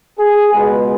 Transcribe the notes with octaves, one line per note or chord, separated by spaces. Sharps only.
G#4
C#2 B2 G#3 B3 B4